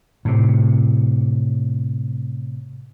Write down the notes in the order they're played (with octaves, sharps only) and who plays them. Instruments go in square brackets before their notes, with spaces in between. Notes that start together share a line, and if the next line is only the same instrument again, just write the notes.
[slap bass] A2 C3